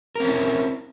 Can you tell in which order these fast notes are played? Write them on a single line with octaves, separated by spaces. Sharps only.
A#4 C4 C#4 E4